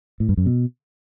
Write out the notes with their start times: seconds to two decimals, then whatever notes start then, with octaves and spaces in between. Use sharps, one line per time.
0.20 A2
0.29 G2
0.37 F#2
0.46 B2